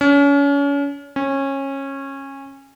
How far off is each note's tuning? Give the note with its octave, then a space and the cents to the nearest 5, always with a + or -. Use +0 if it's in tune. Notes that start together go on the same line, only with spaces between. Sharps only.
C#4 +35
C#4 -20